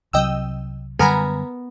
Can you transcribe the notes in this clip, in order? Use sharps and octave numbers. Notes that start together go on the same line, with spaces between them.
C2 C3 F#3 D#5 G5 E6
F#2 D3 G3 B3 A#4 G#5 A#5 B5